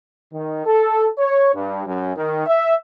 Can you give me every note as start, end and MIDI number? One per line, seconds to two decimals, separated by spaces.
0.33 0.65 51
0.66 1.09 69
1.18 1.50 73
1.54 1.84 43
1.86 2.15 42
2.16 2.46 51
2.47 2.75 76